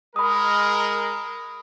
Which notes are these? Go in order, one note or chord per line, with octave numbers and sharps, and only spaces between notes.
G#3 A#4 B5 D#6